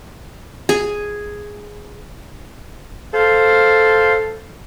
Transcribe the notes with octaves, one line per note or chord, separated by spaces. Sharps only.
G#4
A4 C5 F5